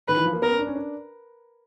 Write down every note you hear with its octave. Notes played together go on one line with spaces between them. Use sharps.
D#3 B4
E3
F3
A#3
B3 A#4
C#4
D4
C#4
D4